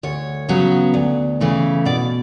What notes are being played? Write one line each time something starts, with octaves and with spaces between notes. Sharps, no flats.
D2 C#5
C#3 F#3 B3
D2
C#3 E3 A3
B2 D5